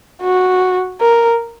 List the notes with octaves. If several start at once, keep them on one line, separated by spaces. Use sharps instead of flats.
F#4
A#4